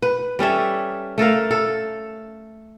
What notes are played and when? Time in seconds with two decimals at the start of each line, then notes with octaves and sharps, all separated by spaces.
0.02 B4
0.39 G3 C#4 A4 E5
1.18 A3 A4 A#4 F5
1.51 A4